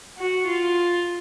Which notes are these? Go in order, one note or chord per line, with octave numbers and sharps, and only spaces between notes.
F#4
F4